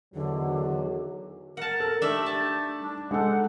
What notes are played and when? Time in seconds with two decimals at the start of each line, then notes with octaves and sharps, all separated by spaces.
0.14 E2 D3 D#3 F#3
1.57 A#4 F#5 A5
1.80 A4 A#4
2.02 A3 D4 D#4 G4 E5
2.26 A5
2.81 G3 D4
3.11 G#3 D#4 A4 F#5